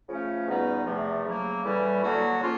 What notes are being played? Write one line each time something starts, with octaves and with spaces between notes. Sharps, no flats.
C#3 F3 A3 C#4 F4
E2 B2 G3 B3 D#4
E2 C3 F3 A3
C#3 F#3 A#3
A2 E3 G3
D3 F#3 A#3 D4 F#4
C#3 F3 A#3 C#4 F4